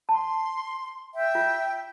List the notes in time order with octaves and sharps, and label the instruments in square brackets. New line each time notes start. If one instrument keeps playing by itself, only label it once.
[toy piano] A5 [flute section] C6
[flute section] E5 G5
[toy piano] F4